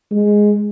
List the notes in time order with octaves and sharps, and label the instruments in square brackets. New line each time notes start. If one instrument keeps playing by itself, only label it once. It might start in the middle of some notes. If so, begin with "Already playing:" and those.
[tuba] G#3